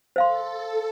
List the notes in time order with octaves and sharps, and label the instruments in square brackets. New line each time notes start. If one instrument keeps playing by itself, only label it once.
[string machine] A4 [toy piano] C5 F5 C6